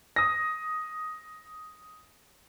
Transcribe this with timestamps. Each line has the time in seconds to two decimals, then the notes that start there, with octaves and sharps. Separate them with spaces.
0.16 D#6 A#6